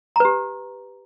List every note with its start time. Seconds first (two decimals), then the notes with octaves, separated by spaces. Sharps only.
0.16 A#5
0.20 B4
0.25 G4